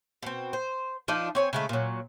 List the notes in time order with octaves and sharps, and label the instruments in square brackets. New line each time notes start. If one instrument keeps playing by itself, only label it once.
[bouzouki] B2 C4
C5
F3 D4 D#4 F4
C4 C#5 G#5
C#3 G#3 A3
A#2 F#3